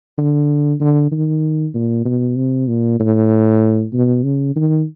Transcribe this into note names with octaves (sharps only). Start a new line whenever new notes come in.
D3
D3
D#3
A#2
B2
C3
A#2
A2
B2
C#3
D#3